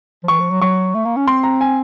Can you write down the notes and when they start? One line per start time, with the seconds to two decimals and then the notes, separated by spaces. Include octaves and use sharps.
0.23 F3
0.28 E3 C#6
0.40 F3
0.50 F#3
0.61 F#3 C#6
0.95 A3
1.05 A#3
1.17 C#4
1.27 C4 C6
1.43 A#5
1.61 G#5